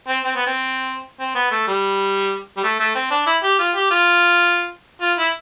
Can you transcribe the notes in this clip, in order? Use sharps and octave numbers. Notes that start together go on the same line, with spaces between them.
C4
C4
B3
C4
C4
B3
A3
G3
G3
A3
A3
C4
D4
E4
G4
F4
G4
F4
F4
E4